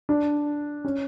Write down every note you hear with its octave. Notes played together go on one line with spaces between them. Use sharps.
D4
C#4